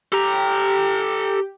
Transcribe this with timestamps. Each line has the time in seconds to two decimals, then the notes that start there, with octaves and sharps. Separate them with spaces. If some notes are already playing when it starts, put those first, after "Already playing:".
0.12 G4 A4 A#5